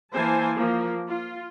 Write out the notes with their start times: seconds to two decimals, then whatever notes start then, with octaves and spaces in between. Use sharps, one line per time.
0.13 E3 A#3 C5 G#5 A5
0.55 F3 A#3
1.07 F4